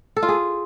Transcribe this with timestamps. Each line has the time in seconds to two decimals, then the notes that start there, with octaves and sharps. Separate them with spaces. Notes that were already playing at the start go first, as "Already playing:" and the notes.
0.17 A4
0.23 F4
0.29 G#4